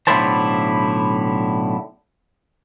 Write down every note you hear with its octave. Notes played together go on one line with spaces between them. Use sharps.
B1 A2 D3 E4 C5 A5